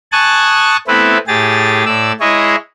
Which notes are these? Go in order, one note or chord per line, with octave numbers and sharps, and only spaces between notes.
G#5 A5 C#6 D#6 F#6 A6
A3 B3 C4 E4 B4
A2 G4 G#4 A6
A2 D5 E6
G#3 E4 G#4 C#5 D#5